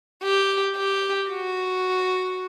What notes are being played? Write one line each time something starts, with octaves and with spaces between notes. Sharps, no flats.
G4
G4
F#4